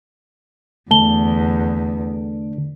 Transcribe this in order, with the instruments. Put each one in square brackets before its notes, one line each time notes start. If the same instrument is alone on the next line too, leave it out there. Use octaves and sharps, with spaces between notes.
[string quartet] E2 [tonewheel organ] D3 [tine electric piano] A3 [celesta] A5 G7